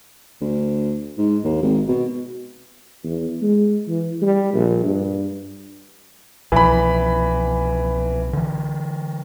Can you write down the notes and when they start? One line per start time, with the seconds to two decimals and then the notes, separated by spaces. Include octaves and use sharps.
0.41 D2
1.18 G#2
1.44 D#2
1.62 G#1
1.88 B2
3.04 E2
3.42 G#3
3.88 E3
4.22 G3
4.53 A#1
4.85 G2
6.52 C2 B2 E3 F3 B5
8.33 D3 E3